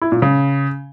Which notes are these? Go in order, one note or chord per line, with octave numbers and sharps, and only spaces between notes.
E4
A#2
C#3